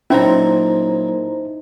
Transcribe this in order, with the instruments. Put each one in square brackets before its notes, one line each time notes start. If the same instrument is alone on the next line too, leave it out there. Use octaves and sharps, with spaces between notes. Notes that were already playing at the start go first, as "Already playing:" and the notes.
[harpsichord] A#2 F#3 A#3 [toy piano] C#4 [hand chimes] D#4 [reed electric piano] E4 C5 A#5